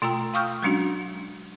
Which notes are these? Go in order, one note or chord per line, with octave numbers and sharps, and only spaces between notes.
B2 A3 F4 G5 A#5 E6
F5 G5 C#6 D#6 F6 G6
F#3 G#3 C#4 D4 F#4